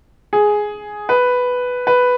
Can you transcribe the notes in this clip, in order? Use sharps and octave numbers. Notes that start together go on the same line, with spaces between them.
G#4
B4
B4